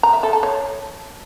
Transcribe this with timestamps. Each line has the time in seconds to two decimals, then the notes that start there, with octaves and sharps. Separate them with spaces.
0.03 A#5
0.13 E5
0.23 A4
0.33 A5
0.43 C#5